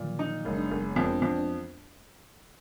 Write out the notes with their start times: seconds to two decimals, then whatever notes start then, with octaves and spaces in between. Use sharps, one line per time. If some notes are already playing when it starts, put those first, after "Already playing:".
Already playing: A#2 D3 D#3 F3 F#3
0.19 D#4
0.44 F#1 G#3
0.55 D4
0.62 B3
0.71 F#1
0.79 G#3
0.96 F2 B3
1.09 D4
1.22 F2 B3
1.35 D4